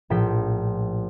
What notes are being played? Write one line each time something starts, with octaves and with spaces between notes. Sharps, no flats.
A#1 A2 F3 G5 B6 D7